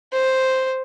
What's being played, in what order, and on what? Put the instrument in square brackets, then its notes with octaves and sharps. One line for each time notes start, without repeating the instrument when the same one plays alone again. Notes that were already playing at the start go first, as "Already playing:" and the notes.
[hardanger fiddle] C5